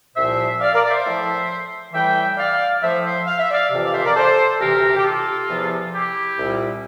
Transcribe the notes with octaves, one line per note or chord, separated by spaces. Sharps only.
C2 A#2 F3 C5 E5
D5 F5
A#4 D5
D5
C5 E5
A2 F3
A2 E3 G3 E5 G5
D5 F5
A2 F3 C5 E5
C5 E5
F5
E5
D5 F5
F2 C3 E3
D5 F5
C5 E5
A#4 D5
A4 C5
D2 C3 E3 G4 A#4
G4
F4 A4
E2 C3 F3
E4 G4
C2 A#2 G3